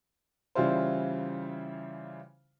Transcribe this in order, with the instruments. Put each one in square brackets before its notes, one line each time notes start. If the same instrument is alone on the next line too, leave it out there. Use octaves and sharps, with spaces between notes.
[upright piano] C#3 E3 G3 E4 F4 C5